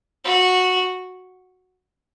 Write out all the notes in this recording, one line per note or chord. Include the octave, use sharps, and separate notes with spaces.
F#4